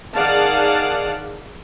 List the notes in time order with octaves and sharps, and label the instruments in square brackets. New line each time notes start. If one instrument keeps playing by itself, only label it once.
[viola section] D#3 G#4 D5 F5 F#5 A5